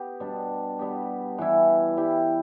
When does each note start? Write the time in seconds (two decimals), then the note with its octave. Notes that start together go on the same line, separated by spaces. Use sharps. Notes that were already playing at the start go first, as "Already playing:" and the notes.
Already playing: B3 G4
0.20 B2 G3 D4
0.79 G3 B3 G4
1.38 E3 G3 E4
1.97 G3 E4 G4